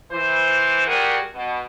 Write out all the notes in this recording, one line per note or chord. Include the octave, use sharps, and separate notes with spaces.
E3 C5
G3 F#4 G#4 A#4
B2